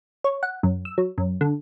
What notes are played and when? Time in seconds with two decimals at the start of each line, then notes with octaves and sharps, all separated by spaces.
0.24 C#5
0.43 F#5
0.63 F#2
0.85 E6
0.98 F#3
1.18 F#2
1.41 D3